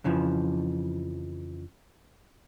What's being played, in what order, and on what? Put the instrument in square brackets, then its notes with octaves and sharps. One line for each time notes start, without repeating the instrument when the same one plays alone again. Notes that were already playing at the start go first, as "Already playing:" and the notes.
[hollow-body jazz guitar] F2 C#3 E3 F3